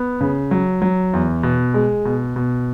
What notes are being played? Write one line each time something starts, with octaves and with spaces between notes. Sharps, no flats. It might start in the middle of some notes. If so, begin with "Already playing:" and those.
Already playing: B3
C#3
F#3
F#3
E2
B2
G#3
B2
B2